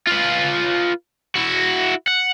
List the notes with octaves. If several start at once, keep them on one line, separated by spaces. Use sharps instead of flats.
F4 B4
E4 F#4
F#5